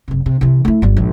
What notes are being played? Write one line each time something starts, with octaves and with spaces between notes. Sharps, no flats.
F#1 C3
C3
C3 E3
A3 E4
G1 G3
A#1 G#2